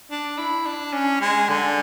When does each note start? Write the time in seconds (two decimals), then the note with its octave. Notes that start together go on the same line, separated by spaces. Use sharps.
0.11 D4
0.38 E4
0.66 D4
0.93 C#4
1.21 G#3
1.49 D3